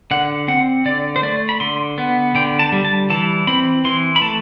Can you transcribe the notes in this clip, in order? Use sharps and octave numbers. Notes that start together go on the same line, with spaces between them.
D3 F#5
C4 F#5
D3 D5
C5
A3 D5
B5
D3 C6
B3
D3 G5
A5
G3
A5
E3 A5
C4 B5
E3 C6
B5
A3 A5